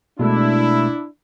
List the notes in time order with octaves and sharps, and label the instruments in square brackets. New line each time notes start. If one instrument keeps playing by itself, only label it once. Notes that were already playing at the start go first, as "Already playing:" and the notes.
[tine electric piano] B2 G#3 A3 [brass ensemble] D4 E4